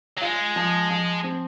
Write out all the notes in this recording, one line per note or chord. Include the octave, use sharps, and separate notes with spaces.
F#3
G#3 F4
F3
F3
C4